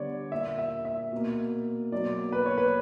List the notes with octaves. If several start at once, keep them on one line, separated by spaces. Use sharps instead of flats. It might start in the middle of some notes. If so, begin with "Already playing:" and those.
Already playing: D3 G3 B3 C#5 D5
A#2 A#3 E5
E5
E5
B2 A#3
B2 F#3 A#3 D5
B4
C#5
B4